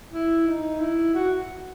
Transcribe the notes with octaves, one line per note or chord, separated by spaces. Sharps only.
E4
D#4
E4
F#4